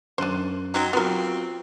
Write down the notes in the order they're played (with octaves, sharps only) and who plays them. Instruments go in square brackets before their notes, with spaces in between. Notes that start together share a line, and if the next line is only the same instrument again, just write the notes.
[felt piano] F#2 F#6 D#7 [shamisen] D4 C5
[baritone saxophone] F#3 [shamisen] C4 D#4
[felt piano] F#3 F4 F#4 [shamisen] B3 A#4 [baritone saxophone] C4